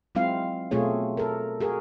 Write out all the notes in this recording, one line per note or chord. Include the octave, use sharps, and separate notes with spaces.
F#3 G#3 C4 E4 F4 F5
B2 A3 C4 F4 G#4 C#5
A4 A#4
F#4 G#4 A#4